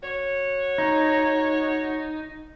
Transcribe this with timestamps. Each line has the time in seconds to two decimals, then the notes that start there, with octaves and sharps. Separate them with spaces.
0.02 F#4 C#5
0.78 D#4